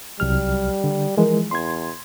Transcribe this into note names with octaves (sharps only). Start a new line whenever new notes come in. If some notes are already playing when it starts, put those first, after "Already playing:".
C2 F#3 G3 F6
D3
E3 F3 G#3 A#4
E2 C6 G#6